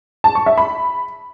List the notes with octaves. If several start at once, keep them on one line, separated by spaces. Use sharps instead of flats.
A5
C#6
E5
B5